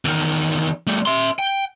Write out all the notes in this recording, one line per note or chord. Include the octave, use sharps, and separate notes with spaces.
E2 D#3
G3 A3
E5 C6
G5